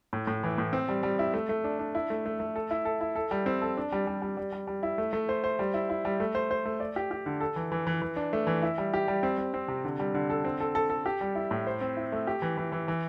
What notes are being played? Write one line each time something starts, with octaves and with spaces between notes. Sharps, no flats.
A2
A2
E3
A2
C4
G3
G3
E4
A3
A3
D4
D4
E4
A3
A3
A3
A4
E4
A4
E4
A4
G3
C4
A4
D4
G3
G3
G3
G3
G3
G3
E4
A3
A3
C5
C5
G3
E4
E4
G3
A3
C5
C5
A3
D5
G4
G4
D3
A4
E3
E3
E3
E3
D4
A3
E3
E4
G3
G4
G3
C4
C4
C4
C3
D3
G3
D3
A4
C4
A4
A4
A4
G4
G3
E4
A2
C5
C4
E4
A3
G4
E3
E3
E3
E3